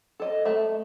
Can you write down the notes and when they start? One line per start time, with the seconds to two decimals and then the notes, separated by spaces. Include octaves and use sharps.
0.20 A4 D#5
0.45 A3 E5 A5